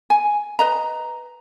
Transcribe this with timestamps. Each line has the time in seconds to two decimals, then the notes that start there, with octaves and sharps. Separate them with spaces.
0.10 G#5
0.59 B4 D#5 A#5